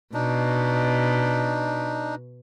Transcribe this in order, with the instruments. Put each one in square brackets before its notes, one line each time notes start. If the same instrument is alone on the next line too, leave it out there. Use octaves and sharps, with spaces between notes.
[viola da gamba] B2 [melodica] D4 D#4